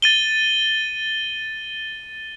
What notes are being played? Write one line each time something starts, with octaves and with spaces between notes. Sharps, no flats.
A6 D#7 G7